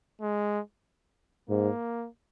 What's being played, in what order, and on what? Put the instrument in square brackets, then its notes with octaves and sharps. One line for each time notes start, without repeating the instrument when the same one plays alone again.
[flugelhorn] G#3
[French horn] G#2 [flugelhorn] A#3